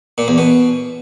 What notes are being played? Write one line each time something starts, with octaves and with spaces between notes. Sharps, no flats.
A#2
E2
B2